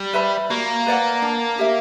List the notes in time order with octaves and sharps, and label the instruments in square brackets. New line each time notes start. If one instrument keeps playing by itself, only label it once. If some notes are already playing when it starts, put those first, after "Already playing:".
Already playing: [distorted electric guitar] G3
[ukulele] B4 E5 B5
[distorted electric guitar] A#3 [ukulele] F#4
[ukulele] B4 D5 F#5
D4
G4 A#4 E5